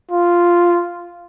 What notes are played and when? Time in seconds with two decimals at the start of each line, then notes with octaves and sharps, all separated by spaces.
0.12 F4